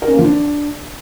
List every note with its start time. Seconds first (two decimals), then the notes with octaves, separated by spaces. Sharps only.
0.02 A#4
0.08 C#4
0.13 A#3
0.19 F3
0.24 D4